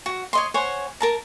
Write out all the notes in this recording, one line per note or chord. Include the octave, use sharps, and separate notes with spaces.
F#4
C#5 D#5 C6
C5 C#5 F#5 G#5
A#4 A5 A#5